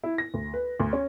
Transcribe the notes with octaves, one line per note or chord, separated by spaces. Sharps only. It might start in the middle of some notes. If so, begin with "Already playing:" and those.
E4
A#6
D2
B4
D2
C#4